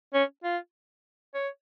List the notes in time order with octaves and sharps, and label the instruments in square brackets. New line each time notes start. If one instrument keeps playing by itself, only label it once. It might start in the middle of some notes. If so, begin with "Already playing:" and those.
[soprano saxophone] C#4
F4
C#5